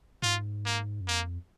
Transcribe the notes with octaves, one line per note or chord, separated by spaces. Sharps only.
G#2 F4
A#3
F#2
F2 A#3